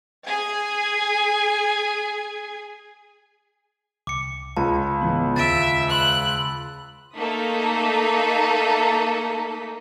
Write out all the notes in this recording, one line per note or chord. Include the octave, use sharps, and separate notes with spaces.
G#4 G#5
C2 D6 C#7
C#2 A5
G#2 E3 B3
D#2 C#3 E5 A6 D7
B5 C6 E6 F#6
A3 A#3 D#4 A4 D#6 B6